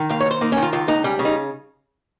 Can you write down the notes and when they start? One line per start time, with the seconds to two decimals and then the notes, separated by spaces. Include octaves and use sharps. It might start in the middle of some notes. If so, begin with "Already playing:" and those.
Already playing: D#3
0.10 D#2 F5
0.20 C#5
0.26 D#2 C5
0.41 A#3 D#4
0.52 C#4
0.57 D#3
0.63 F4
0.73 C#2 F4
0.88 C#2 D#4
1.04 G3 C#4
1.19 C#3
1.25 D#4